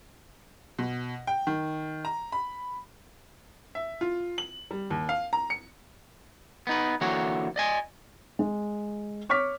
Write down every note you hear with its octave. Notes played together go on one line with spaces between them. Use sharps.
B2
G5
D#3
A#5
B5
E5
F4
F#7
G3
D#2
F5
A#5
C#7
B3 D#4 B4
D3 E3 A#3 F#4 C#5
D5 D#5 G#5
G#3
C#5 C#6 D6 F6 B6